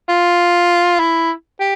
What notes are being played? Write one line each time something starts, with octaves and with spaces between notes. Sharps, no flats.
F4
E4
G4